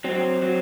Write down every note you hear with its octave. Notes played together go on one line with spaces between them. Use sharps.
F#3 C4
F#3